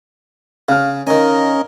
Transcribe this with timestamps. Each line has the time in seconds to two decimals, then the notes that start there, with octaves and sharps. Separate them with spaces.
0.69 C#3 F5 F6
1.07 D#3 C#4 A#4 D#5 G#5